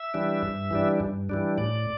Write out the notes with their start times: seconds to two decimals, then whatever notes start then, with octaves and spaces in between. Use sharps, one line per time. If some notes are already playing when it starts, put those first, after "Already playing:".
Already playing: E5
0.14 E3 G3 D4
0.43 G2
0.71 E3 G3 D4
1.00 G2
1.30 E3 G3 D4
1.58 A2 D5